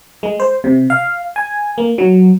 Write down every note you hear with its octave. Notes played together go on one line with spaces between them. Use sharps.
G#3
C5
C3
F5
G#5
A#3
F#3